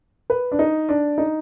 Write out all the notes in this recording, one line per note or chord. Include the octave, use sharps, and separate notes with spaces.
B4
D4
D#4
D4
D#4